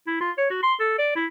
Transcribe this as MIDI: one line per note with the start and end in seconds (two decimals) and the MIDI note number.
0.07 0.20 64
0.21 0.31 65
0.38 0.47 73
0.50 0.60 66
0.63 0.74 84
0.80 0.98 69
0.98 1.11 74
1.15 1.26 64